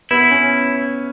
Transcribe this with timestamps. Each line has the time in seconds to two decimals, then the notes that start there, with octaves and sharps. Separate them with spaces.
0.11 B3 E4
0.31 C#4